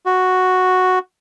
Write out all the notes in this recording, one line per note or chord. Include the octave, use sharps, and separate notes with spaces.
F#4